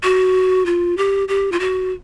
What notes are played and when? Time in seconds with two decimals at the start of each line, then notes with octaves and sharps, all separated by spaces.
0.03 F#4
0.66 F4
0.97 G4
1.28 G4
1.52 F4
1.60 F#4